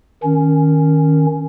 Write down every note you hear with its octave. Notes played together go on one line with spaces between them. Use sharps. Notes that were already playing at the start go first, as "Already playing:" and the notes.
D#3 C#4